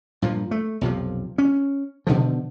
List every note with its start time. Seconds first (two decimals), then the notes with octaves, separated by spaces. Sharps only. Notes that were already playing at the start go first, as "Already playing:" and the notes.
0.22 G2 A#2 F3
0.51 A3
0.81 B1 F2 C3 F3
1.38 C#4
2.07 B2 D3 D#3 F3